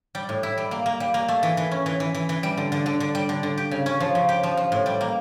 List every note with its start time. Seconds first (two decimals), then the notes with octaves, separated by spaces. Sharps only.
0.15 G3
0.29 A2
0.43 E4
0.58 G3
0.71 A#3
0.86 A#3
1.00 G3
1.14 A#3
1.28 A3
1.43 E3
1.57 E3
1.71 C#4
1.86 E3
2.00 E3
2.14 E3
2.29 E3
2.43 G3
2.57 D3
2.72 D3
2.86 D3
3.00 D3
3.15 G3
3.29 D3
3.43 D3
3.58 G4
3.71 C#3
3.86 C#4
4.00 F3
4.15 C#3
4.29 G4
4.43 F3
4.57 F3
4.72 A2
4.86 G3
5.01 A#3